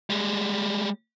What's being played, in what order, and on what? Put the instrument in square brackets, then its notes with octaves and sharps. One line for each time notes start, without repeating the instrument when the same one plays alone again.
[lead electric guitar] G3 G#3